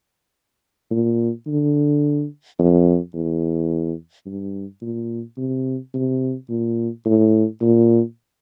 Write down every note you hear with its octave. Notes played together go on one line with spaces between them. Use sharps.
A#2
D3
F2
E2
G2
A#2
C3
C3
A#2
A2
A#2